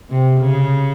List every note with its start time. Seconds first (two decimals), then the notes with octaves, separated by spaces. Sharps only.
0.10 C3
0.40 C#3